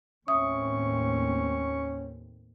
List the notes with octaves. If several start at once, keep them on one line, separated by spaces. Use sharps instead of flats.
D#2 A2 C4 C#4 E5 C#6 D#6